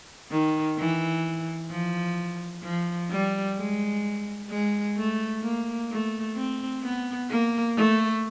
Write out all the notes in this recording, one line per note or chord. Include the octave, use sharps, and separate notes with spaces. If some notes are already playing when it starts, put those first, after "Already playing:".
D#3
E3
F3
F3
G3
G#3
G#3
A3
A#3
A3
C4
B3
A#3
A3